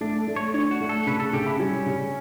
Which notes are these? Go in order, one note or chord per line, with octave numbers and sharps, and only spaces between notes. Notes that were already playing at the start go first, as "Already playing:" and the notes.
A3 D4
A3
C#5
D4 C#5
F#4
A3
A4
C#3 B4
A4
C#3 G4
E4
G3 C#4
C#3